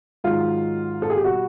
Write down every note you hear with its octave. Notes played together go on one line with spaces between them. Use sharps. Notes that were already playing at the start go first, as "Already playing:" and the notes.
G#2 D#3 F#3 F4
A4
G#4
G4
B2 G3 F#4